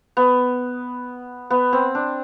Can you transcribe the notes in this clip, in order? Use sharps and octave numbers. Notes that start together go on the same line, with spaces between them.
B3
B3
C4
D4